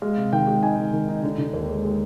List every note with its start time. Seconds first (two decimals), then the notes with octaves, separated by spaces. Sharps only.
0.02 G#3 F5
0.17 C3
0.32 D#3 G5
0.47 G#3
0.63 D#4 G#5
0.78 D#3
0.93 D#3
1.08 D#4
1.23 D3
1.38 D3
1.53 D#2
1.69 G#3
1.84 G#3